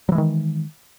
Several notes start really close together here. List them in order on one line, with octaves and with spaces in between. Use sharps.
F#3 E3 G#3 D#3